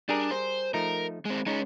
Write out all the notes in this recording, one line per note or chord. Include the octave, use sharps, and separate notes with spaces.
G3 D4 G#4 A#4
C5
F3 A3 D#4 A#4
G#3 C4
G#3 C#4 D#4